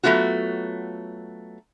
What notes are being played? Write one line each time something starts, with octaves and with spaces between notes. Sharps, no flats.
F#3 A3 B3 F4 F#4